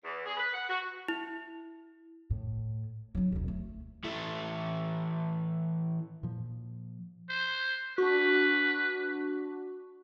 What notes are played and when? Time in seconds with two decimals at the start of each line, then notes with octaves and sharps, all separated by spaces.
0.03 E2
0.24 G#4
0.37 B4
0.53 F#5
0.68 F#4
1.08 E4
2.30 A2
3.15 F#3 D#4
3.32 E1 D2
3.48 A3
4.04 E3 A3
6.23 A#2 F3
7.30 C5
7.98 D4 F#4 B4